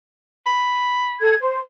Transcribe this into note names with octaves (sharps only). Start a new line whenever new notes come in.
B5
A4 G#6
C5